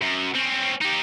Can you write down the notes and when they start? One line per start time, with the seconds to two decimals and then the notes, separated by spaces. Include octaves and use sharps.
0.01 F#2
0.35 C4 C#4
0.81 D#4 G4